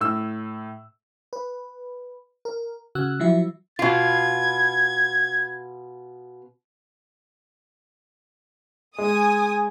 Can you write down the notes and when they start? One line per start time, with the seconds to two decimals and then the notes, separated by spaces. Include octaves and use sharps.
0.01 A2 E6
1.33 B4
2.45 A#4
2.95 C#3 F#4 E6 F#6
3.20 F3 F#3 E4 F#4 E5
3.79 B2 F4 G#6
8.98 G#3 G#5 D#6